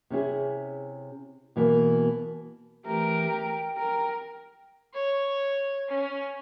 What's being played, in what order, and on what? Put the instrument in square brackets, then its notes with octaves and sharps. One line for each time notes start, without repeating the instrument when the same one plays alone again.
[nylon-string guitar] C3 C#4 E4 G#4
B2 E3 A#3
[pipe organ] E3 A3 [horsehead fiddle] G4 A#4
[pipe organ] G5
[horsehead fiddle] A#4
[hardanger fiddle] C#5
C#4